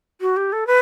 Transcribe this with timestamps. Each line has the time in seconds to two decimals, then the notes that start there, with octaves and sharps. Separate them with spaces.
0.21 F#4
0.37 G4
0.52 A4
0.67 B4